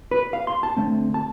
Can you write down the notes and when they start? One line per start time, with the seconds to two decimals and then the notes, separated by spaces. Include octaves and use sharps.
0.11 B4
0.33 F5
0.47 C6
0.63 A5
0.77 D3 A3 C4
1.14 A5